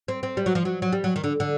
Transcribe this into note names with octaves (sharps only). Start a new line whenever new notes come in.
C4
C4
G3
F#3
F3
F#3
F#3
G3
F#3
D#3
D3
D3